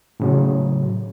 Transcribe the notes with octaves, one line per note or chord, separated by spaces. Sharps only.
A2 C#3 F#3